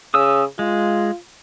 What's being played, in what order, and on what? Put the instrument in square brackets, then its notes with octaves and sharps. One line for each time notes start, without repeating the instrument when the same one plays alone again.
[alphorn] C#3 [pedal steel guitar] D#6 E6
[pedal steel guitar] G#3 [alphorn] F4